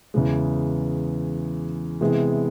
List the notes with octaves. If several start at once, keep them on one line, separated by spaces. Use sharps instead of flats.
E2 C#3 E3 G#3
C3 E3 G#3 B3